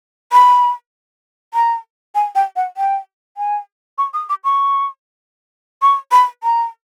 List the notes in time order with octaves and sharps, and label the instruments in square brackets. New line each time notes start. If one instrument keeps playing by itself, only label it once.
[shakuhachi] B5
A#5
G#5
G5
F#5
G5
G#5
C#6
D#6
D6
C#6
C#6
B5
A#5